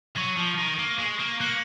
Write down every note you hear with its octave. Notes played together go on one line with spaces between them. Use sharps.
F#3 C#6 G#6 D#7
F3
D#3
A#3
G#3
A#3
A#3 F#6 C#7 F#7